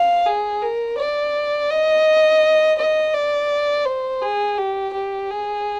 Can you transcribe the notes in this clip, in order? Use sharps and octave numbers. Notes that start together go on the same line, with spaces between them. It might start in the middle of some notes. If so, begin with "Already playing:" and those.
Already playing: F5
G#4
A#4
D5
D#5
D#5
D5
C5
G#4
G4
G4
G#4